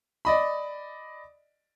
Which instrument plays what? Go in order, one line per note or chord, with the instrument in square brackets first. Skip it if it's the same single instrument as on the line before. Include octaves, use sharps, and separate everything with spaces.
[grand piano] D5 D#5 B5